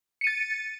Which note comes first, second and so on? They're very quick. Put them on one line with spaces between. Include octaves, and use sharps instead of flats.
C#7 D#7 A6